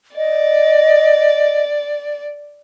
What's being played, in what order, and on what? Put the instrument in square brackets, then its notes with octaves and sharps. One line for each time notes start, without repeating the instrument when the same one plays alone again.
[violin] D5 [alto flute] D#5